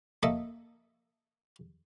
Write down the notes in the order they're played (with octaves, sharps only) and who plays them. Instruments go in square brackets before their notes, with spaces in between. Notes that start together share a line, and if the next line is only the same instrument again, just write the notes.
[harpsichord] A3 A#3 D#5 E5